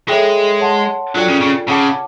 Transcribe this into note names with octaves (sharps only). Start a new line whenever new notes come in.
G#3 A4 C#5 E5 G5 B5
C#5 F#5 A5 C6
F#3 D4 F4 A4 D5 G5
C#3
C#3
C#3 C#5 F#5 A5 D6